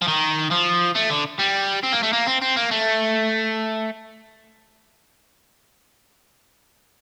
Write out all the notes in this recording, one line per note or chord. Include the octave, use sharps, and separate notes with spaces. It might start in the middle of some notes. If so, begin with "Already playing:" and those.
F3
D#3
F3
A3
D3
G3
C4
A#3
A3
A#3
C4
C4
A#3
A3